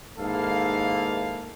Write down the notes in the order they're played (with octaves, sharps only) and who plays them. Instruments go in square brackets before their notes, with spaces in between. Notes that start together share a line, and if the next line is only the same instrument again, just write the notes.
[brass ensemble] G#2 D#3 A#3 E4 A4 F5